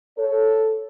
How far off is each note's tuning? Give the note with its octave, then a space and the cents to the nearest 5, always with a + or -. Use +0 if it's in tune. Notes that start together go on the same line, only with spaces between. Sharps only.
A4 +0 C#5 +0